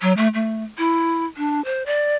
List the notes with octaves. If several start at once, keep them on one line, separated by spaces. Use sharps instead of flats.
F#3
A3
A3
E4
D4
C5
D5